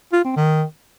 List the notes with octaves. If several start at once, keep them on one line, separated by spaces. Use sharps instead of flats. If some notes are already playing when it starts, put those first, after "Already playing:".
F4
C4
D#3